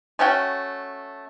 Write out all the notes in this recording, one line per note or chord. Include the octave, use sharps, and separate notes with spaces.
A3 C#4 F#4 G5